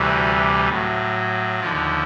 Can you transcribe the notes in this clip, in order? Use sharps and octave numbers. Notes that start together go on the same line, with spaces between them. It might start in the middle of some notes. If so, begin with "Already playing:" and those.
Already playing: D2 C3 E3 G3 F#4
A2 F#3
D#2 D3 F3 F4